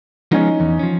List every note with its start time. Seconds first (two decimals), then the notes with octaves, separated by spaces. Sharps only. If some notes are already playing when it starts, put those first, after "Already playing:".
0.32 F3 G#3 B3 C#4 D#4
0.60 E2
0.79 F3 C#4